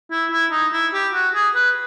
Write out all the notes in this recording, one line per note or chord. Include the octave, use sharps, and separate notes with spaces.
E4
E4
D#4
E4
G4
F#4
G#4
B4